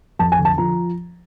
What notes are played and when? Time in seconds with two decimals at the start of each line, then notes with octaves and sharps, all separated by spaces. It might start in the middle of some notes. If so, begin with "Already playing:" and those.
0.19 F2 A5
0.32 G#5
0.39 D3
0.45 A5
0.58 F3 A#5